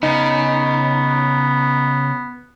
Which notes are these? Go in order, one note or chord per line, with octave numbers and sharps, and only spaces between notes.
C#3 B3 D#4